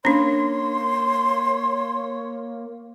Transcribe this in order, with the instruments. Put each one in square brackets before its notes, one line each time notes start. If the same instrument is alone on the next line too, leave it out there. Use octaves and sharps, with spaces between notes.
[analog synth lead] A#3 [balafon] C#4 D4 [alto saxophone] C#5 [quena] C6